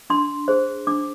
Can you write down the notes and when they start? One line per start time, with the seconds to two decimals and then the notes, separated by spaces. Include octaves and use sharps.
0.10 D4 C6
0.48 G#4 C5
0.87 D4 D6